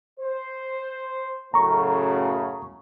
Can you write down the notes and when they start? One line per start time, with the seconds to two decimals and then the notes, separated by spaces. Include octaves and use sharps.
0.20 C5
1.54 F#2 A2 C#3 A#5 C#6